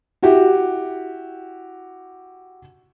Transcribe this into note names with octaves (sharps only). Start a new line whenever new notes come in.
E4 F#4 G4